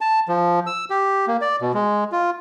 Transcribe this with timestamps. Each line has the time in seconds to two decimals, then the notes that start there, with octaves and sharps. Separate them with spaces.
0.01 A5
0.28 F3
0.67 E6
0.90 G4
1.27 A#3
1.41 D5
1.61 B2
1.74 G#3
2.12 F4